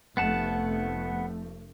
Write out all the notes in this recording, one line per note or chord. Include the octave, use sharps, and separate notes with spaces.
F1 F3 A3 B3 F#5 A5